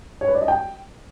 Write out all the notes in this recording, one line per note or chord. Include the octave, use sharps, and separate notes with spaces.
C#5
B4
D5
D#5
G5